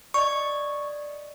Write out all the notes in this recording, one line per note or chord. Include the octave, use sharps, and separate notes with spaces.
D5 D#5 C#6